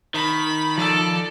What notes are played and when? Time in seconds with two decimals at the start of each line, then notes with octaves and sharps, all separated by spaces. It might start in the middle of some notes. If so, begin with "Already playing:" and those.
0.14 D#3 B5
0.78 F3 A4 D5 E6